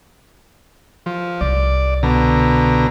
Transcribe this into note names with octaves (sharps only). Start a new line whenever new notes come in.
F3
C2 D5
B2 D3 A#5